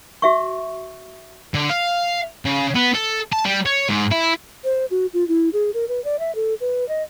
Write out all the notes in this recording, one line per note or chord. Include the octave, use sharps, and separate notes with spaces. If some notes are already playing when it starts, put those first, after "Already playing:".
F#4 E5 C#6
D3
F5
C#3
B3
A4
A5
G3
C#5
G#2
E4
C5
F#4
F4
E4
G#4
A#4
B4
D5
E5
A4
B4
D#5